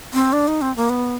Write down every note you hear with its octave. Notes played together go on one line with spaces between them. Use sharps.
C4
D4
D#4
C4
A#3
B3